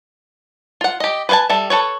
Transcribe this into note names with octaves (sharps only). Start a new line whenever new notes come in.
F4 F#5
G4 D#5
B4 C5 F5 G#5 A5
G3 A4 E5
A4 B4 C#5